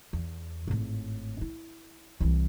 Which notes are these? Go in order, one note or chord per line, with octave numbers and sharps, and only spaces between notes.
E2
G#1 A2
E4
C2 E3